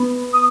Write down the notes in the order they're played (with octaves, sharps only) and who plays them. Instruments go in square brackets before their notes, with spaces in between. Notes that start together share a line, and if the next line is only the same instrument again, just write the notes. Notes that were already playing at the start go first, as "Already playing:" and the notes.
Already playing: [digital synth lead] B3
[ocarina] D#6